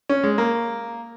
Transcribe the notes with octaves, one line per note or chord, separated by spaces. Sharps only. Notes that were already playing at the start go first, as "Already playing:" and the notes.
C#4
G#3
A#3